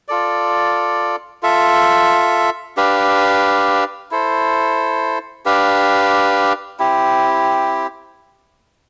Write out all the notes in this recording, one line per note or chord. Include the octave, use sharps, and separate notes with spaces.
F4 A4 D5
F4 A4 E5
D4 G4 B4 F5
E4 A4 C5
D4 G4 B4 F5
C4 E4 G4